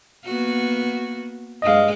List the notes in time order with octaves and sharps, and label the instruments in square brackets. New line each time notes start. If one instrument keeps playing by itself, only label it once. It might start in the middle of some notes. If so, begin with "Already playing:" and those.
[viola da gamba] A#3 B3 F#4
[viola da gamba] G2 G#3 [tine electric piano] D#5 F5